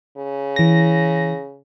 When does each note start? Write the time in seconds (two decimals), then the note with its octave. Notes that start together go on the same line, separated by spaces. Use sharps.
0.17 C#3
0.56 E3 A#6